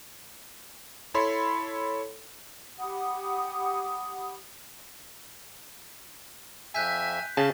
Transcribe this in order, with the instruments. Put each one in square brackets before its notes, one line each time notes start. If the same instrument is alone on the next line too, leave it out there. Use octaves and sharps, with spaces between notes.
[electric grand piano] E4 A4 C#5 B5 C6
[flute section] G4 F#5 B5 D#6
[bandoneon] F2 E5 E6 [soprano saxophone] G#5 [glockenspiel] F#6 G6 B6
[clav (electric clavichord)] C#3 [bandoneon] C#4 G#4 [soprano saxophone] A5